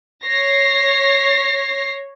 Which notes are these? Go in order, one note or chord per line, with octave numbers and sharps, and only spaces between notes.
C#5 A#6 C7